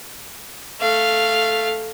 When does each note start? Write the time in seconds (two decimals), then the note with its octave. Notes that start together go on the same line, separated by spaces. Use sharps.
0.81 A3 F5